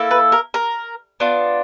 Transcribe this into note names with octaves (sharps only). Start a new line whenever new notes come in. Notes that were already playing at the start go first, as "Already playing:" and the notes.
Already playing: A#3 E4 A4
B4
A#4
A#4
B3 D4 F4